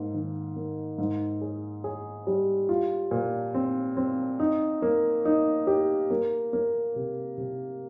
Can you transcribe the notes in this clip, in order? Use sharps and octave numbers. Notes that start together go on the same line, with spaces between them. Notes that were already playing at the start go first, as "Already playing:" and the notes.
Already playing: G#2 A#3
D#3
A#3
G#2
G#4
G#4
G3
F4
A#2
C4
C4
D#4
A#3
D#4
G4
A#3
A#3
C3
C3